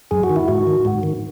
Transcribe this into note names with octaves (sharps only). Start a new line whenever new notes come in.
F#2 G#4
F#4
D#3
E4
G#2 F#4
D#3
G#2
D#3